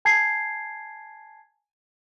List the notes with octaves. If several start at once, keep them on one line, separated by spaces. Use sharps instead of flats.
G#5 A5 G#6 C7